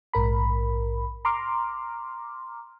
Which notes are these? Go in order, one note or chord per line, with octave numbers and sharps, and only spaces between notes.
A#1 G#2 A#4 B5
A#5 C6 D6 F6